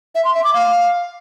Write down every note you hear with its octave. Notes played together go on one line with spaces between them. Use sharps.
E5
C6
E5
D6
F5